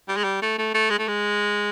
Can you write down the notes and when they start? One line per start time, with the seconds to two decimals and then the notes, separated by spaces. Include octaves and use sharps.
0.09 G3
0.17 G#3
0.24 G3
0.42 A3
0.59 A3
0.74 A3
0.90 G#3
0.99 A3
1.08 G#3